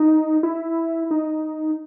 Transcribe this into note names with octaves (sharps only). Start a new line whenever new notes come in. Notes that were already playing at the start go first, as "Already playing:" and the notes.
Already playing: D#4
E4
D#4